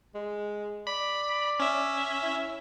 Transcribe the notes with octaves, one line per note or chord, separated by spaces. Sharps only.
G#3
D5 B5
C#4 E5
E4